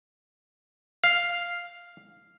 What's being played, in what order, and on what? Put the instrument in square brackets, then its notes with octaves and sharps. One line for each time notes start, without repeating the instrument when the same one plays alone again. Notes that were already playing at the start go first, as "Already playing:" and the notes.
[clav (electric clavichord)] F5